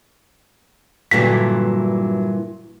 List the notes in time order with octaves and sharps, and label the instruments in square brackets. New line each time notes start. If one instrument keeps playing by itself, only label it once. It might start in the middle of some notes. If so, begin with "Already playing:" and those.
[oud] G2 A#2 E3 [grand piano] D3 F#3 [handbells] B6